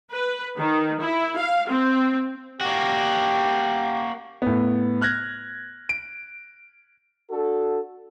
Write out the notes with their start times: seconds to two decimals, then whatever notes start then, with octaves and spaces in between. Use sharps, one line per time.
0.11 B4
0.58 D#3
1.00 E4
1.36 F5
1.68 C4
2.61 A#3 F#4 G4
4.42 A2 B3
5.01 F6 F#6 G#6 A#6
5.89 D7
7.30 D4 F#4 A4